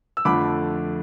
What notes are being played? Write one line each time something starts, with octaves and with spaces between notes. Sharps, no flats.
E6
F2 D3 A3 B5 D6